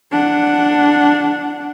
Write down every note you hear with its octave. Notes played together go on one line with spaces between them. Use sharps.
D4 F#5